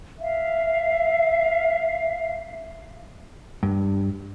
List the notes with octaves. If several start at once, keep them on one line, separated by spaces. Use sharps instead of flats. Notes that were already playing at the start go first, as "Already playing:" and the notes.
E5 F5
G2